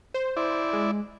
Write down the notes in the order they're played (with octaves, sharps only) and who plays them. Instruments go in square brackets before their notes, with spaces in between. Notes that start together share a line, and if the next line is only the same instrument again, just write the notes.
[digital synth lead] C5
[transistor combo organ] E4 D5
[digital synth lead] G#3